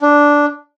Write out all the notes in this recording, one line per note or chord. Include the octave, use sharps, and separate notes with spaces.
D4